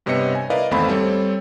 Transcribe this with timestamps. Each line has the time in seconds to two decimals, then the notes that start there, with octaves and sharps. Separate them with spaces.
0.06 G2 C3 B3 C#5 D#5 C#7
0.35 G#5
0.50 E4 A#4 B4 D5 D#5 F5
0.71 G#1 E2 A3 C4 F5 B5
0.89 G3 C4 A4 C#5